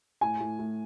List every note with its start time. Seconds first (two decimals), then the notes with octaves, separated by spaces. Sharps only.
0.21 A2 G#5
0.40 A2
0.59 A2